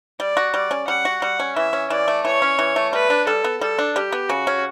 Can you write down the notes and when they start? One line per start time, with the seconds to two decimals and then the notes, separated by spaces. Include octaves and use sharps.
0.20 G3 D5
0.37 F#4
0.53 G3 D5
0.71 C#4
0.88 G3 F#5
1.05 F#4
1.22 G3 F#5
1.40 C#4
1.56 E3 E5
1.73 C#4
1.90 E3 D5
2.08 A3
2.25 E3 C#5
2.42 C#4
2.59 E3
2.76 A3
2.93 G3 B4
3.10 D4
3.27 G3 A4
3.44 B3
3.61 G3 A4
3.79 D4
3.96 G3 G4
4.12 B3
4.29 C#3 F#4
4.47 C#4